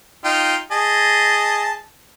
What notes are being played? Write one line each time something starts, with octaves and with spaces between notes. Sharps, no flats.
D#4 F4 G5
G#4 D#5 A5